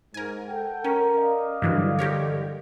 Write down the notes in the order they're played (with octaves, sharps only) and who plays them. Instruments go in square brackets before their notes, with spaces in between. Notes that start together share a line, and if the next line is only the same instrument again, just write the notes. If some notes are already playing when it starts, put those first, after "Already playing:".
[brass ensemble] G#2 [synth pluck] A#4 G#5
[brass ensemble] A4 F#5 G5
[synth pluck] C#4 [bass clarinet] A#4
[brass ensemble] D5 D#5 F5
[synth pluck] G2 E3 F#3 [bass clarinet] D3
[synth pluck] G4 A#4 C#5